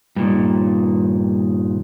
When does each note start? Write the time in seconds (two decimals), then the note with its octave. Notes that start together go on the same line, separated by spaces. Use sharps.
0.16 G2 A#2 D#3